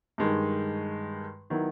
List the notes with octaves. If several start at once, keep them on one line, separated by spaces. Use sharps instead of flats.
G2 D#3 G#3
D#3 F#3 B3 E4